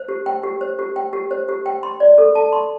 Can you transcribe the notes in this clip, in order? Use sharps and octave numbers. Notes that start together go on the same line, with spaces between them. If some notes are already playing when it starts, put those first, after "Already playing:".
Already playing: C5
G4
G5
G4
C5
G4
G5
G4
C5
G4
G5
C6
D5
A4
A5
C6